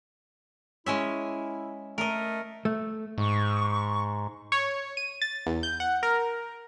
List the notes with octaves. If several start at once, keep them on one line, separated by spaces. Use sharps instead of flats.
G#3 C#4 E4 E5
A3 A#4 D#5
A3
G#2 C#6
C#5
D#7
A6
E2
G6
F#5
A#4